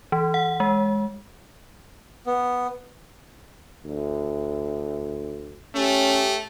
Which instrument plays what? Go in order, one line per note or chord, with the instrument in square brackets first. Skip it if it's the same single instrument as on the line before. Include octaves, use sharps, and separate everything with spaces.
[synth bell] E3
F#5
G#3
[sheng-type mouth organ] B3
[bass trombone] D2
[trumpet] A3 [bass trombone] C#4 [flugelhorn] G4